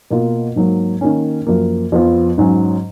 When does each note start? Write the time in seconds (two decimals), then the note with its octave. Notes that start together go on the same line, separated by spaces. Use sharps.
0.11 B2 A#3 F4
0.56 G#2 F#3 A#3
1.01 D#3 A#3 C#4
1.47 F#2 F3 A#3
1.92 F2 F3 B3 F4
2.38 G#2 F#3 C#4